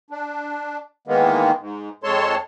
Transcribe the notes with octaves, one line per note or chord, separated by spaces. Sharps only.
D4
D#3 E3 G#3 A#3 B3
G#2
F2 G#3 A4 C#5 A5 C6